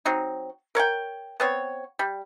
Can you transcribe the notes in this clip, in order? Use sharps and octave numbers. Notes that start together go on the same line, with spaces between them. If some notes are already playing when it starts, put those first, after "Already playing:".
F#3 C4 D#4
A#4 C#5 F#5 G5
B3 C4 C#5
G3